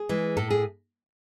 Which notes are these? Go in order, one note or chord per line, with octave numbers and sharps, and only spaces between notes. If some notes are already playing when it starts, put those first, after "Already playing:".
Already playing: G#4
E3 G#3
A2 A4
G#4